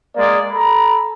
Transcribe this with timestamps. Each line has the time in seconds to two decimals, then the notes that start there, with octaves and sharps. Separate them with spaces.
0.16 G#3 A#3 D5
0.51 A4 A#5 B5